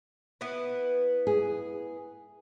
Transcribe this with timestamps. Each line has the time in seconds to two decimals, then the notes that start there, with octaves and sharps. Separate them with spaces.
0.41 B3 E4 B4
1.27 G#4